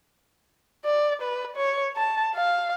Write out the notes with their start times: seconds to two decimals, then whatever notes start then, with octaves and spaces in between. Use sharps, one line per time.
0.85 D5
1.22 B4
1.57 C#5
1.97 A5
2.35 F5